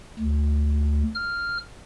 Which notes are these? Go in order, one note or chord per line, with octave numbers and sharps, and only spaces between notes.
D2
F6